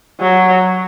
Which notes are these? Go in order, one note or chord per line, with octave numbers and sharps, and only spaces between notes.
F#3